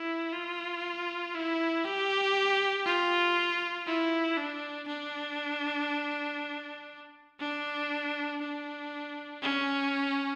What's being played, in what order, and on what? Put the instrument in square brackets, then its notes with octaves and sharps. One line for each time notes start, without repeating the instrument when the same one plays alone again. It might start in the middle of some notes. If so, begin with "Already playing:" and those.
Already playing: [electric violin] E4
F4
E4
G4
F4
E4
D4
D4
D4
D4
C#4